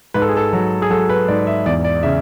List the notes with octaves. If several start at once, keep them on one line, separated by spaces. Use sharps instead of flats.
G#2 B4
A4
G#4
A4
F#3
G#4
F#3 A4
B4
G#2 D5
E5
E2 D5
D5
C#3 E5